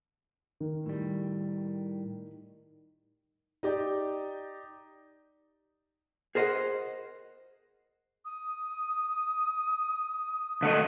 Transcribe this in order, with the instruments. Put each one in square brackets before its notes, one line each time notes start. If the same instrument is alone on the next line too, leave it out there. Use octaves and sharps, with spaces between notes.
[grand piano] D#3
[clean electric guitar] A2 G3
[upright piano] D#4 G4 D5
[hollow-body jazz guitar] G#4 A#4 C5 D#5 F#5
[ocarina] D#6
[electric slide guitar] D3 A3 D#5